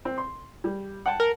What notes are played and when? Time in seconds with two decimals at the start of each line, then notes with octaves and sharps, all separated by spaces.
0.05 C4
0.18 C6
0.64 G3
1.06 F#5 G5 A5
1.20 A#4